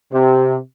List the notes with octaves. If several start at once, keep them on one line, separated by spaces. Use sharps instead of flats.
C3